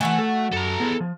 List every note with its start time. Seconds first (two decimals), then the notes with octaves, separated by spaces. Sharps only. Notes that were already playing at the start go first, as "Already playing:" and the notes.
0.01 E3 A3 F#4 E5 F#5 G#5
0.19 A4
0.53 F#2 A4 A#5
0.80 B3 E4 G#4
1.00 F3